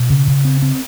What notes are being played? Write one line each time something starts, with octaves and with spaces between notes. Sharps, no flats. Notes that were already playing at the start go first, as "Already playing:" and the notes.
Already playing: B2
C#3
C#3
C4
C4